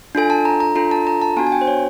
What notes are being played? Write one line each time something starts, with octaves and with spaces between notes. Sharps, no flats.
D4 F4 A4 G#5
A5
A#5
A#5
D4 F4 A4 A#5
A5
A#5
A5
B3 D4 F#4 G#5
G#5
G5
C5
C#5